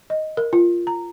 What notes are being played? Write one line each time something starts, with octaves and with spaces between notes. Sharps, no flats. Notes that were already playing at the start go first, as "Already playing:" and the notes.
D#5
A#4
F4
A#5